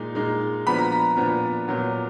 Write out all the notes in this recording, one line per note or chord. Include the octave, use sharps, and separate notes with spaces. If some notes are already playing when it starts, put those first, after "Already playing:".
Already playing: A#2 G#3 D#4
A#2 G#3 D#4
A#2 F3 B3 D4 B5
A#5
A#5
A#2 F3 B3 D4
A#2 F#3 B3